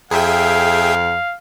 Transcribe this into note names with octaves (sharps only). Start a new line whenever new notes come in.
F2 G#4 E5 F5 G5